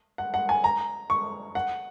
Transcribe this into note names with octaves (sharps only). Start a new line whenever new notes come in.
F#5
F#5
G#5
A#5
C#6
F#5